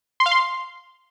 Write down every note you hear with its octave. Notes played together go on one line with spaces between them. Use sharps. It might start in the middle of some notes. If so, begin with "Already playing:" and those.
C6
F5
C6